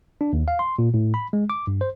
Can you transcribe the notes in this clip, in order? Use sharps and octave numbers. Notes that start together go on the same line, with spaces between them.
D4
D#2
F5
C6
A#2
A2
B5
G#3
D6
G2
C5